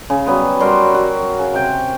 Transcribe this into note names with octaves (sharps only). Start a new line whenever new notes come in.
C#3
F#3 G3 B3 B4
F#3 G3 A#4 C6
F#4
C#3
C3 G5